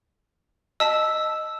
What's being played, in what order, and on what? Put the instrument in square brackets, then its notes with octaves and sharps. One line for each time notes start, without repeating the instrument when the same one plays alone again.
[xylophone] D#5 A5 B6 [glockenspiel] E6